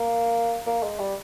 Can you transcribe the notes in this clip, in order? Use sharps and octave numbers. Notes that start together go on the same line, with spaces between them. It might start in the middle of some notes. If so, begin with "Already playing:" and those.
Already playing: A#3
A#3
G#3
G3